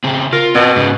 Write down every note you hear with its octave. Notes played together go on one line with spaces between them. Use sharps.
C#3 C4
F4 A#4
B2 C4 D#5
G#2 C#3